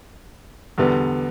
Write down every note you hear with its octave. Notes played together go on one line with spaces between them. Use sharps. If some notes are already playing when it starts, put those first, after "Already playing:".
E2 D3 G3 B3